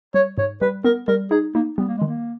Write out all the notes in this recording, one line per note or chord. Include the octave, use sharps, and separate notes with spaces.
G3 C#5
G#2 C#5
G3 B4
B3 A#4
G3 A#4
D#4 G#4
A#3 D#4
G3 B3
A#3
D#3 G#3
A#3